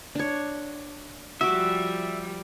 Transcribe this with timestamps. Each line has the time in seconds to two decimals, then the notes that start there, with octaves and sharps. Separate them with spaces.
0.15 D4 C#5
1.41 F3 G3 F#4 E5 D6